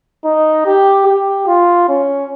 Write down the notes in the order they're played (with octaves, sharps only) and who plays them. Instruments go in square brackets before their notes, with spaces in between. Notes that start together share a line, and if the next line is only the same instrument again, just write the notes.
[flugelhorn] D#4
G4
G4
F4
C#4